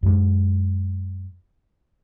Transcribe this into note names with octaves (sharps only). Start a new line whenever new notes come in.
F#2 G#3